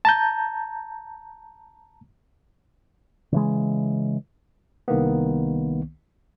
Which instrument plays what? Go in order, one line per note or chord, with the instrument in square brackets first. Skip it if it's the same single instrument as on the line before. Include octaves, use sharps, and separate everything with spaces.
[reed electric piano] A5 A#5 G6
[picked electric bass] C#3 E3 G#3
[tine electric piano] C2 D#3 A#3 B3